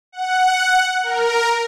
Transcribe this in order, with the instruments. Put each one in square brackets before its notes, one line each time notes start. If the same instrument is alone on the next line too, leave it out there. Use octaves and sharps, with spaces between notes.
[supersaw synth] F#5
A#4